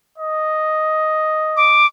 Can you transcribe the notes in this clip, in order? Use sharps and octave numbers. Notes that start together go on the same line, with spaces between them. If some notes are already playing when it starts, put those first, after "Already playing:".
D#5
D6